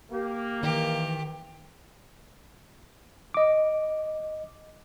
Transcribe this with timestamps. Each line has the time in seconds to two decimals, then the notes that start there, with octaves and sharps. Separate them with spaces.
0.12 A#3 G4
0.63 D#3 E3 G4
3.34 D#5 D6